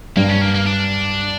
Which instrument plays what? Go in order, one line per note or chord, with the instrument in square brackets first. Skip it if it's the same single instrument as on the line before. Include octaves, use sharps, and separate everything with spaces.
[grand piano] G2 [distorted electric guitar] A#3
[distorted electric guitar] C#4
A#3
A#3
D4